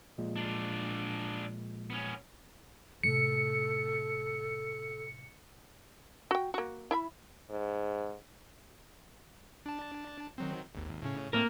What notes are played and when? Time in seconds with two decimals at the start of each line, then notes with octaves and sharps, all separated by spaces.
0.18 A#2 F3 G#3
0.36 D4 F4
1.90 B3 C#4
3.03 A2 C3 A4 C#7
6.31 F#4 G5
6.54 A#3 F#4
6.91 E4 E5 B5
7.50 G#2
9.66 D4 A5
10.38 D#3 F#3 C4
10.75 G#1 D#2
11.02 A2 C#3 C#4
11.33 A2 A3 A#3 C4 A#4